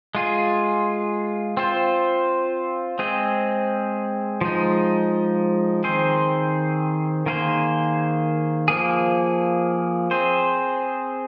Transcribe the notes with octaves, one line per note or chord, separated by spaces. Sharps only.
G#3 F4 G#4
C4 F4 C5
G#3 C4 G#4
F3 G#3 D#4
D#3 C4 G#4 C5
D#3 A#3 G#4 C5
F3 A#3 G#4
C4 G#4 C5